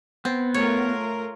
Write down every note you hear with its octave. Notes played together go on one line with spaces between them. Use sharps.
B3 C4
A3 F4 A#4 C#5